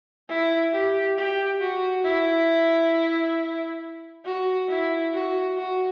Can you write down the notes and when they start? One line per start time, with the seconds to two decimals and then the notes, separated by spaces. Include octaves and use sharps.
0.29 E4
0.73 G4
1.17 G4
1.61 F#4
2.04 E4
4.25 F#4
4.69 E4
5.13 F#4
5.57 F#4